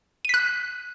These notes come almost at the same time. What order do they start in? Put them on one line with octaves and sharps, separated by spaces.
D#7 B6 F#6